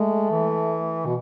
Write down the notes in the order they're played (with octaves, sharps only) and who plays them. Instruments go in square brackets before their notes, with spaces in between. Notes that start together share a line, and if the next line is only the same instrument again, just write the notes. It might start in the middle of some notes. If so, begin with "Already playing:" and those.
Already playing: [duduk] G#3 [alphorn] A3
[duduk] E3
B2